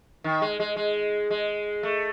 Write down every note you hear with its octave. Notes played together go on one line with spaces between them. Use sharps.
D#3
G#3
G#3
G#3
G#3
A3